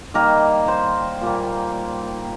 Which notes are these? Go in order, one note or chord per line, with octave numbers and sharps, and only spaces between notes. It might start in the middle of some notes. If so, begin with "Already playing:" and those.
D#3 G3 A#3 A#4
C5
A#2 G3 A#3